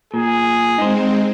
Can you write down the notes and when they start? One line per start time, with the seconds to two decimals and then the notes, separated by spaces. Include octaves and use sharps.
0.14 A#2 G#4
0.78 G#3 C4 D#4 C5